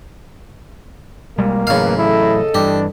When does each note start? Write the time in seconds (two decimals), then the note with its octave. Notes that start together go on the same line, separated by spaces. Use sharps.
1.38 B1 G3 G#3 A#3
1.67 A1 A2 C#3 F#3 B4 F5
1.97 E4 A4 D#5
2.54 G2 E3 D4 G4